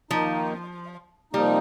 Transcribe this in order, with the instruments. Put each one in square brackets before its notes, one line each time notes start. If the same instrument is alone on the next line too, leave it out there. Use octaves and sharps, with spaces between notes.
[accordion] D#2 D#3 A#3 D#4 [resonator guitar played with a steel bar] F3
[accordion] C3 F3 A#3 D#4 [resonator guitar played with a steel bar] G3